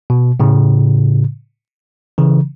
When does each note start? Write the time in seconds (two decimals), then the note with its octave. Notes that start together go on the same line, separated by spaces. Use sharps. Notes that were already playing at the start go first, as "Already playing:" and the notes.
0.10 B2
0.40 A2 C#3
2.18 C#3 E3